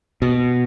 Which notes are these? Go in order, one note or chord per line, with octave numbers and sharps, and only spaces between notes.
B2